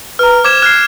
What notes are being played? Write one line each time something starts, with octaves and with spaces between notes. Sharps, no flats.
B4 A#5 F6
C5 D6 G#6 E7
F6 F#6 G#6 C7